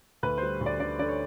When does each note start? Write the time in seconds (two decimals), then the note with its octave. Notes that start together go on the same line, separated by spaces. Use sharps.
0.23 D2 B4
0.38 G3 C5
0.61 D2
0.66 D5
0.79 D3 D5
0.99 D3 D5
1.09 C#5